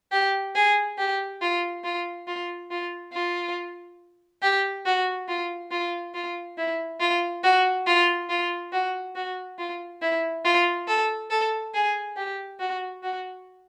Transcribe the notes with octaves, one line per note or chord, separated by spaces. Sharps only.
G4
G#4
G4
F4
F4
F4
F4
F4
G4
F#4
F4
F4
F4
E4
F4
F#4
F4
F4
F#4
F#4
F4
E4
F4
A4
A4
G#4
G4
F#4
F#4